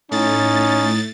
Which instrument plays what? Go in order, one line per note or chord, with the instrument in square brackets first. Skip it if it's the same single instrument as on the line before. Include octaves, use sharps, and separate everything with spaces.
[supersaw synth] A2 A6 [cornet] C#4 [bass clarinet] D#4